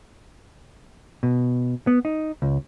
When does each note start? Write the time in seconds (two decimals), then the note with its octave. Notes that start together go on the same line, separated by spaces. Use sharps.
1.23 B2
1.87 B3
2.05 D#4
2.42 C#2